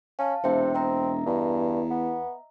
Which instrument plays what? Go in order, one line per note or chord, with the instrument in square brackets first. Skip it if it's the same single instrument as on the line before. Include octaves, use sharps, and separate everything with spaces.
[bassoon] C#4 [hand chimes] F5 A5
[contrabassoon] E1 [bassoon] C3 [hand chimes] C5 E5 G5
[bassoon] C4 [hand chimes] D#5 E5 A#5
[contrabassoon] E2 [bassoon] G2
[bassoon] B3